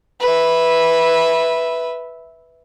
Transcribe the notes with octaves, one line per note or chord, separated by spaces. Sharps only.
B4 E5